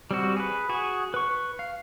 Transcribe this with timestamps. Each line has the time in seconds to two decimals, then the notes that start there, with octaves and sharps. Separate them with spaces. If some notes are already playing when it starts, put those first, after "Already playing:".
0.11 G3 C4 F#4
0.37 G#4 B4
0.69 F#4 G#4
1.14 B4 C#6
1.59 F5